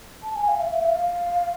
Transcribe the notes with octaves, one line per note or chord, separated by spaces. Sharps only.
A5
G#5
F5
E5
F5
E5
F5